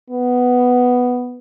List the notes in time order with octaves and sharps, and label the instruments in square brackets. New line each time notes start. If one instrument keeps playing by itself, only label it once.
[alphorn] B3